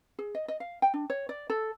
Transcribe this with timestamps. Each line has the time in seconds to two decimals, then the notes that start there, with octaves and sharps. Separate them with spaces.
0.19 G#4
0.35 D#5
0.48 D#5
0.60 F5
0.82 G5
0.94 D4
1.10 C#5
1.29 D5
1.50 A4